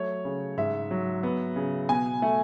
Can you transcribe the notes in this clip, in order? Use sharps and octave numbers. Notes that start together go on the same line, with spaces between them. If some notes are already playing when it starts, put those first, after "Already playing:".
Already playing: F#3 A3 C#5
C#3
G#2 E5
F#3
B3
C#3
B2 G#5
A3